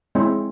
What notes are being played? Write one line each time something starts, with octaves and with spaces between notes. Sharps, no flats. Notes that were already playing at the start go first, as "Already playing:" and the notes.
G#3 C4 E4 C#5